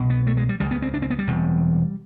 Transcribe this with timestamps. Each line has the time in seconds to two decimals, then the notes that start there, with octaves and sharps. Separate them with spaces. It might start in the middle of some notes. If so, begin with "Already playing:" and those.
Already playing: C2 B2
0.10 B3
0.27 A3
0.37 G#3
0.49 G3
0.60 C#2 C#3 G3
0.71 B3
0.82 C4
0.94 D4
1.02 C4
1.10 B3
1.19 G3
1.27 E1 E2 C3